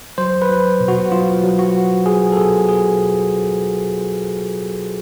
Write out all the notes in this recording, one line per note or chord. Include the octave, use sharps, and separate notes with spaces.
F#3 C5
B4
F#3
B2
F#4
F#3 F4
F#3
F#4
F#3
F#3 G#4
A4
B2 G#4
B2 G#4